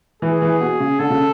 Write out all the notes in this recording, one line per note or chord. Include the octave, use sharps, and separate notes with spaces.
E3 G#4
E3
B2
C#3
D3 A4
C#3